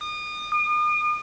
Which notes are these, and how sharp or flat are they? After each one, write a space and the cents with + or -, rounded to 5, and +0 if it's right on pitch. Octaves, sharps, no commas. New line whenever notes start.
D#6 -35
D#6 -45